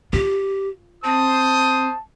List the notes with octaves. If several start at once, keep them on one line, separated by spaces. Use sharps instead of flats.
F4 G4
C4 C5 A5 D#6